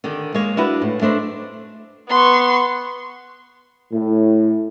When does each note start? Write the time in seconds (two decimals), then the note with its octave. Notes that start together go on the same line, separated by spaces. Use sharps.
0.04 D3 D#3 G4
0.34 G#3 A#3 C#5
0.57 D4 E4 F#4 B4
0.81 A2
1.01 A3 D4 C5 D#5
2.09 B3 C6 C#6
3.92 A2